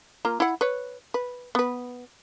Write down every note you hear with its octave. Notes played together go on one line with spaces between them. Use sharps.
A#3 F4 A#5
E4 F#5
B4 C#5
B4
B3 B4